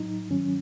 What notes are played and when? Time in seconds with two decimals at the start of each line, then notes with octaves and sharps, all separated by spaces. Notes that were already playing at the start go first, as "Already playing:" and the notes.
Already playing: A2 F#3 D#4
0.30 G#2 D#3 F#3 C#4